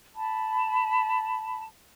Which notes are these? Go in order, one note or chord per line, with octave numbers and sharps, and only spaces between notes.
A5 B5